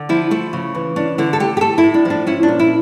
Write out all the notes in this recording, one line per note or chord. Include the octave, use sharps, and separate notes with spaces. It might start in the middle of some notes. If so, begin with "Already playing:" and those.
Already playing: D3
F3 E4
A3 E4
C#3
E3
C#4 D4
D3 E4
A4
A3 G4
G4
A3 A4
E4
A2
D4
F3 D4
C#4 E4
D4
A#2
E4